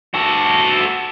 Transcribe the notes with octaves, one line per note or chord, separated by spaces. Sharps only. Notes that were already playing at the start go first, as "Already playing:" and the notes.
F#4 A4